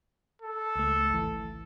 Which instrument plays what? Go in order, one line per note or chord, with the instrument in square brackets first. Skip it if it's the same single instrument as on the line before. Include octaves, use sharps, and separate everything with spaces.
[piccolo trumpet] A4
[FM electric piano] C#2 A3
G#1 E3